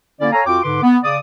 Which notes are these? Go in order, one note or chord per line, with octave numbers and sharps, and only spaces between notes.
D3 A#3 C#4 E4 D5
A4 C#5 F5 G#5 A#5
F2 F4 F#4 G5 D6
G#2 D3 B4 C6 D6
B3
C#3 D5 D6 D#6